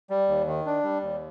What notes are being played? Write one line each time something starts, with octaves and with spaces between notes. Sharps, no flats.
G3
D#2
D#3
D4
G3
D#2